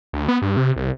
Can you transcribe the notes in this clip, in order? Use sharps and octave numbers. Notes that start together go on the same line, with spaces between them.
D2
B3
G2
C3
C2